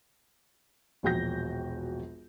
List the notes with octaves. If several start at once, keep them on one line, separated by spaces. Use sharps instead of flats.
E1 A#1 F#4 G5 G6 A#6